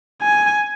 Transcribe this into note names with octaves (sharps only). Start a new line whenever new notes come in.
G#5